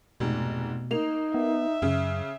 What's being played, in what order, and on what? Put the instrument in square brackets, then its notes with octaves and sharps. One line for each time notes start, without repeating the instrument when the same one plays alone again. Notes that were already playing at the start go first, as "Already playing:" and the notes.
[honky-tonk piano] F1 G#2 [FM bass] B2
[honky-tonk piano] A#3 F7 [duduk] D#4
[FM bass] B3 [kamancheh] E5
[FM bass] F#2 [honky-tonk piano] C#3